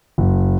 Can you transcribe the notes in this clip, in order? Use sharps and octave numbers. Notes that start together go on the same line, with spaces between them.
F#1